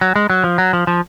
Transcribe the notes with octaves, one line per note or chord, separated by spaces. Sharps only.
F#3
G#3
F#3
F3
F#3
F3
F3